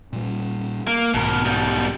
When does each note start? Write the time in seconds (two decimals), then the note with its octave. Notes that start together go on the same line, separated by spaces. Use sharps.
0.13 A#2 G3
0.87 A#3
1.14 B1 G#2 B2 D#3 A#4
1.45 B2 G3